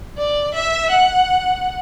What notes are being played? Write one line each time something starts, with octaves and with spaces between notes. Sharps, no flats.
D5
E5
F#5